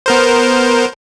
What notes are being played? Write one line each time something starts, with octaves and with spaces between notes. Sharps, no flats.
B3 A#4 C5